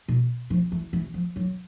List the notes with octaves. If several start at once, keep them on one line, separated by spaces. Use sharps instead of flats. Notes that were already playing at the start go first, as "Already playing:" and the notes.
B2
F3
E3
E3
F3
F#3